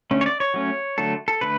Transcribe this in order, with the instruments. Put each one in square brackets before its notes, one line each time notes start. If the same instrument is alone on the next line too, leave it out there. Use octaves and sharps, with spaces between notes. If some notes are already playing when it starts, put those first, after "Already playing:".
[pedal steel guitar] D3 A3 C#4
C#5
D5
C#5
F#3 A3 C#4
D3 F#3 A3 A4
A4
D3 A3 B4